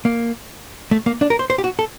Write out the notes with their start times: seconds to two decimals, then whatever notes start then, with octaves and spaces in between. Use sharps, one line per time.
0.05 A#3
0.91 A3
1.06 A#3
1.21 D4
1.30 A#4
1.39 C5
1.50 C5
1.58 G4
1.64 F#4
1.79 A4